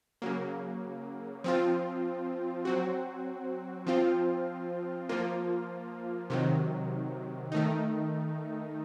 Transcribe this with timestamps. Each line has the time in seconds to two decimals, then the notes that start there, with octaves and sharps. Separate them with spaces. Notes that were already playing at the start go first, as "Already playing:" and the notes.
0.22 C#3 F#3 A#3
1.44 F3 C4 F4
2.65 F#3 C4 F#4
3.87 F3 C4 F4
5.09 F3 A#3 F4
6.30 C3 D#3 F#3
7.52 D#3 A3 D#4